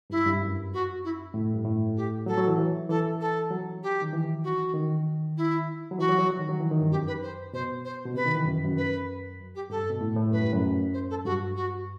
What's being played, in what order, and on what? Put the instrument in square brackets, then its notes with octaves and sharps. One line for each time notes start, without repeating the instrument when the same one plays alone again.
[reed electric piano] G2 [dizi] E4
[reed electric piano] G2
F#2
[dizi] F#4
E4
[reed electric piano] A2
G2
A2
[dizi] G4
[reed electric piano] F#3 [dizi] A4
[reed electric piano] F#3
E3
E3
[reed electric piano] E3 [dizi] A4
[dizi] A4
[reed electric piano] F#3
[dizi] G4
[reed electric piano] D#3
E3
[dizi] F#4
[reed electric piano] D#3
[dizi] E4
[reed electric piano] F#3
[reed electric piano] E3 [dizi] F#4
[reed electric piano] F#3
F#3
D#3
F#3
E3
D#3
G2
[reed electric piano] F#2 [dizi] G4
[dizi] B4
C5
[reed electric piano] B2 [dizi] C5
[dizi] C5
[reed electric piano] B2
[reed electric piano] C3 [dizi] B4
[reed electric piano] D#3
E3
F#2
F#2
[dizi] B4
G4
[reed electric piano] G2 [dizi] A4
[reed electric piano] B2
A2
A2
[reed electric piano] F#2 [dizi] B4
[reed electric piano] G2
F#2
[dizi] C5
A4
[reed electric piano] G2 [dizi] F#4
[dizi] F#4